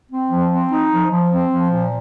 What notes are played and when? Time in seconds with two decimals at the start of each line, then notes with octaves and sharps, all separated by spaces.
0.12 C4
0.31 F3
0.51 C4
0.71 D#4
0.91 F3
1.11 F3
1.32 C4
1.50 F3
1.70 A#2